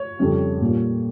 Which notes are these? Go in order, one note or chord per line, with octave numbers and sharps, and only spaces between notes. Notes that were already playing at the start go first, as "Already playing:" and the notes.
Already playing: C#5
F2 C#3 G3 C#4
A#2 G3 A#3